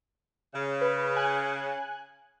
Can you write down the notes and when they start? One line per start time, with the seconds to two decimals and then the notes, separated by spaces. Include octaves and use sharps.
0.54 C#3
0.81 B4
1.16 G#5 F#6